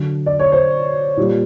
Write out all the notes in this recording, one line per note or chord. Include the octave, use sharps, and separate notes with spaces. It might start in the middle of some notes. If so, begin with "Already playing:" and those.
Already playing: D3 F#3
D5
C#5
C5
A#2 G3